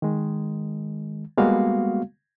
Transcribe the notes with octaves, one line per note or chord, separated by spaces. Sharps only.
D#3 G#3
G3 G#3 A#3 B3 F#4 F5